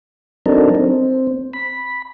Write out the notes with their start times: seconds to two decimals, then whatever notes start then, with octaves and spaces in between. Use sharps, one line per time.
0.46 F#3 C4 D4 D#4 A4 A#4
0.75 C4
1.53 B5